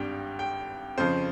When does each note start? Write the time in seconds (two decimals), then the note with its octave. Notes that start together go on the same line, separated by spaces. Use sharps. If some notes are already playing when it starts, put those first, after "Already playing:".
Already playing: G#1 G2 G3 G5
0.39 G5
0.97 F2 C#3 F3 C5